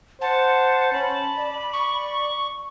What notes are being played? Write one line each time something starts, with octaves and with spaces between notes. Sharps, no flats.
C5 F#5 A5
C#4 B5
D5
C#6